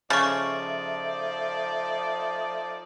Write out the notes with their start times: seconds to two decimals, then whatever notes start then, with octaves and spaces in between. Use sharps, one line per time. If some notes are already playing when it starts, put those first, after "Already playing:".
0.10 C#3 F3 A3 D#4 D5 C#6 A6